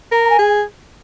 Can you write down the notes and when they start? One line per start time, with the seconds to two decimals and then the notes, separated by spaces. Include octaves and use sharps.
0.12 A#4 A#5
0.25 A#5
0.30 G#5
0.39 G#4